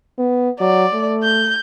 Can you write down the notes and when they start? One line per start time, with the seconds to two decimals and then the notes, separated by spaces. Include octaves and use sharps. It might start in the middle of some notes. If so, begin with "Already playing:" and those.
0.18 B3
0.60 F#3 D5
0.94 A3
1.23 G6